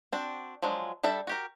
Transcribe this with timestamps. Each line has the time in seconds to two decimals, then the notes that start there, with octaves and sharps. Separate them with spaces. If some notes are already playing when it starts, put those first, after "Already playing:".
0.12 C4 D4 F#4
0.62 F3 F#3 G#3 D4
1.03 G3 D4 A4 E5
1.27 F#4 G4 A#4